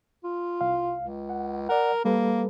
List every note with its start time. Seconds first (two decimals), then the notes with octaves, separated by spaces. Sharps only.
0.24 F4
0.61 C2 F5
0.99 C#2
1.29 F#5
1.69 A#4 D5 F#5
2.05 G3 A#3 A4 B4